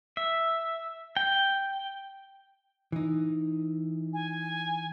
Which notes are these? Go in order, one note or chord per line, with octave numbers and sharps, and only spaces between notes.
E5
G5
E3 D#4
G#5